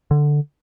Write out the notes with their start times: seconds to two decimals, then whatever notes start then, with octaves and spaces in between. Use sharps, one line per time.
0.11 D3